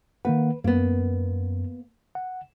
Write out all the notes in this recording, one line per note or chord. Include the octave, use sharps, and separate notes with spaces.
D#3 A#3 B4 F#5
F#2 A#3 B3
F#5